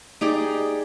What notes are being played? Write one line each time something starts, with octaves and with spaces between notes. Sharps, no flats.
D#4 G4 G#4 D5